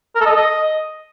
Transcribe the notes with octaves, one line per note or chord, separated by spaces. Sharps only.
A#4
A4
D#5
A4
D#5